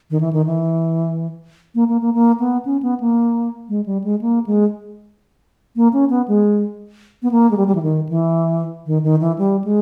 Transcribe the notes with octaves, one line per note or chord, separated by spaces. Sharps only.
D#3
E3
D#3
E3
A#3
A#3
A#3
A#3
B3
C#4
B3
A#3
G#3
G3
G#3
A#3
G#3
A#3
C#4
B3
G#3
B3
A#3
G#3
G3
G3
E3
D#3
E3
D#3
D#3
E3
G3
G#3